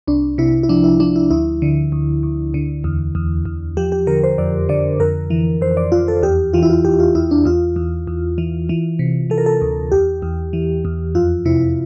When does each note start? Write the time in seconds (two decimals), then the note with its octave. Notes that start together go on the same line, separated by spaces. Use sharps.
0.08 C2 D4
0.38 C3 E4
0.63 E4
0.69 F3 D4
0.84 E4
1.00 F3 D4
1.16 E4
1.31 D2 E4
1.62 D3
1.92 D2
2.23 D2
2.54 D3
2.84 E2
3.15 E2
3.45 E2
3.77 F3 G4
3.92 G4
4.07 D3 A#4
4.24 C5
4.38 F2 D5
4.69 D3 D5
5.00 F2 A#4
5.30 E3
5.61 F2 C5
5.77 D5
5.92 F2 F4
6.08 A4
6.23 E2 G4
6.53 E3 F4
6.63 E4
6.70 F4
6.85 E2 G4
7.00 F4
7.15 E2 E4
7.31 D4
7.45 E2 F4
7.76 E2
8.07 E2
8.38 E3
8.69 E3
8.99 C3
9.30 E3 A4
9.38 A#4
9.46 A4
9.61 D2
9.92 E2 G4
10.22 E2
10.53 E3
10.85 E2
11.15 F2 F4
11.45 C3 E4